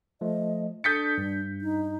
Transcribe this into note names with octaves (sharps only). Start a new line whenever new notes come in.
F3 A3 D#5
D4 A4 D#6 G6 A6 B6 C#7
G2
D#4